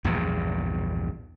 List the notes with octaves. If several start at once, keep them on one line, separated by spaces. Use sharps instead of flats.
A#1 E2 G2 B2